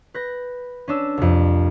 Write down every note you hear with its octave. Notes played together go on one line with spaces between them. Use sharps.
B4 G6 A#6
C#4 D4 E6
C2 F2